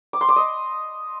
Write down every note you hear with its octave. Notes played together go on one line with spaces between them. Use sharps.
D6
C6
D6
D#5